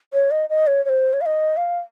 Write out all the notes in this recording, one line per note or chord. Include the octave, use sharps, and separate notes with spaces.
C#5
D#5
D#5
C#5
C#5
C5
C#5
F5
D#5
F5